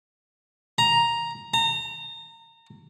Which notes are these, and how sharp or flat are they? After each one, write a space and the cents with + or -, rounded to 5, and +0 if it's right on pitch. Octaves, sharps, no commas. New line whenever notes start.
A#5 +5
A#5 -30